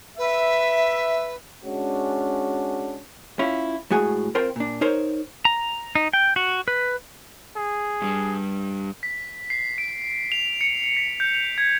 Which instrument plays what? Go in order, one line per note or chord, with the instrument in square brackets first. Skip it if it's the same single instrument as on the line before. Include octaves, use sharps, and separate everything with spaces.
[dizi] B4 [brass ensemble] E5
[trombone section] G#3 C#4 D4 F#4
[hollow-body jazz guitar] C#4 E4 F4
A2 G#3 F#4 G#4 G#5
C4 F4 A#4 C5 G5 C6
A#2 D4
D#4 A#4 C5 C#5
[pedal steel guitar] A#5
D#4
G5
F#4
B4
[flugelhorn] G#4
[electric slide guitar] G2 G3
[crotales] B6
C7
D7
F7
C#7
B6
G6
F7
G#6